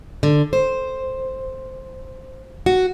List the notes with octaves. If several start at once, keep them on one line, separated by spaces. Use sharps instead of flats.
D3
C5
F#4